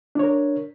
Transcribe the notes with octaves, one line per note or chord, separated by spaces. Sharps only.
D4 A#4 C#5